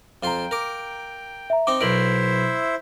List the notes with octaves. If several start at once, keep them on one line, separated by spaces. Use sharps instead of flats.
F2 F4 F5 G5 A#5 C6
A#4 D6
E5 A#5
C4 D#4 G5 D6
B1 B2 E4 A#4 C5 E5 D7 F#7